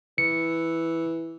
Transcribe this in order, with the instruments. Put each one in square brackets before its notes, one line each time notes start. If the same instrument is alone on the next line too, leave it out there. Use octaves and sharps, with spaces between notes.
[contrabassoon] E3 [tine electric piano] C#7